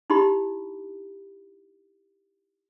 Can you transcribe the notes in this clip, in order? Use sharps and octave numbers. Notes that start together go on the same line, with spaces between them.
D#4 E4 G4 B5